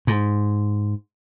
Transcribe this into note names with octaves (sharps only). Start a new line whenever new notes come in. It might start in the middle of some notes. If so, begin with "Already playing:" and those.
G#2